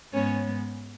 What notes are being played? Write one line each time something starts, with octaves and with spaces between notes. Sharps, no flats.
G#2 G#3 B3 C#4 C#5